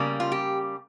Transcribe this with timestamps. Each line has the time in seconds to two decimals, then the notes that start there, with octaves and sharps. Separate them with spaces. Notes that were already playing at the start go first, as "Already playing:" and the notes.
Already playing: C#3 G3 A#3
0.20 F4
0.32 G4